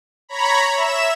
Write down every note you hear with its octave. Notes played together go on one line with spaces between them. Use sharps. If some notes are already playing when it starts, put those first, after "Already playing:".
C#5 A#5 B5
E5 E7